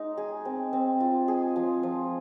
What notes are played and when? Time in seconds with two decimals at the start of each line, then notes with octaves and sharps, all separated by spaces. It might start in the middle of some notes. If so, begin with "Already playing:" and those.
Already playing: G#3 D#4
0.17 G#4
0.45 C4
0.73 C4
1.00 F4
1.28 G#4
1.56 F3
1.83 F3